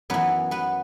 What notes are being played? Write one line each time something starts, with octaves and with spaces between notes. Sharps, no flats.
F#2 E3 B3 B4
B3 B4